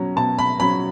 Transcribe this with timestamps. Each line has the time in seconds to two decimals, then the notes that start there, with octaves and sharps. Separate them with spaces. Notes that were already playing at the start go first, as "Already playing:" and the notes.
Already playing: B2 F#3 C#4
0.16 B2 A5
0.39 B5
0.60 F#3 C#4 B5